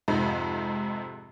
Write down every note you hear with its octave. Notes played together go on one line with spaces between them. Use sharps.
F2 G#2 C3 G#3